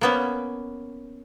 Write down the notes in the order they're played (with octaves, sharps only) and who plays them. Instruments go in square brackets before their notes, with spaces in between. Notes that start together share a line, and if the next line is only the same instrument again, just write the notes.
[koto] A#3 B3 C#4